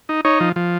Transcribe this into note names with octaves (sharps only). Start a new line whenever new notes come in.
D#4
D#4 C#5
F3
F3